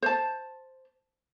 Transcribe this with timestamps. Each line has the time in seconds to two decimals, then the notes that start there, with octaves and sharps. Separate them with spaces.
0.02 C5 A5